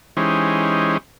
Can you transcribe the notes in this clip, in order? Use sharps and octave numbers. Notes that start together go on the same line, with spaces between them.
E3 G#3 C#4 D#4 G4 C5